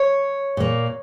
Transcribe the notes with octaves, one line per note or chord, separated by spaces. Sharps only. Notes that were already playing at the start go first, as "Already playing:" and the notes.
Already playing: C#5
A#2 A#3